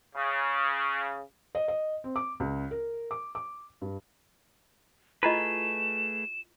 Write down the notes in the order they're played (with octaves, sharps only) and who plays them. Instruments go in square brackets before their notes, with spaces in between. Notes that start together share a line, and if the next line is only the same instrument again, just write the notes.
[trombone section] C#3
[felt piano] D#5
D#5
C4
D6
C#2
A#4
D6
D6
G2
[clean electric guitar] A3 G#4 B4 [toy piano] E4 F4 D#5 [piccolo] E7